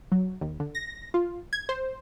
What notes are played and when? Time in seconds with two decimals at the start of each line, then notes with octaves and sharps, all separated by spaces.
0.12 F#3
0.41 D#2
0.60 D3
0.75 A#6
1.14 F4
1.53 G#6
1.69 C5